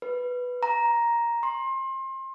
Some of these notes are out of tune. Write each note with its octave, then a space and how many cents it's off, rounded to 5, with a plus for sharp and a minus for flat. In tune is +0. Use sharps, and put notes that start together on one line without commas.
B4 +0
A#5 +5
C6 +30